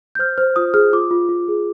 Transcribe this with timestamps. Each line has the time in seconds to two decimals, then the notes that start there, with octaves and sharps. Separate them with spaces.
0.15 G6
0.19 C5 F6
0.38 C5 F6
0.56 F4 D#6
0.74 G#4 F6
0.93 F4 D6
1.11 F4
1.29 F4
1.48 G#4